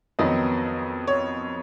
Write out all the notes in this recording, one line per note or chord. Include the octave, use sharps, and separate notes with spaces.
F2 D#3 F#3 B3 D#5
C#5